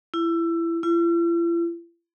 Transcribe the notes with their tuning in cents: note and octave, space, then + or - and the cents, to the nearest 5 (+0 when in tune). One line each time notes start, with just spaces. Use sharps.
E4 +20
E4 +45